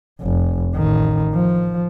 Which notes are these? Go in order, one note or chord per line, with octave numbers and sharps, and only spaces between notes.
F1
A1 D#3
F3